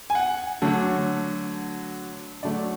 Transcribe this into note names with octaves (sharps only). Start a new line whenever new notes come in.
G#5
F#5
D3 F#3 A3
D3 F#3 A3 D5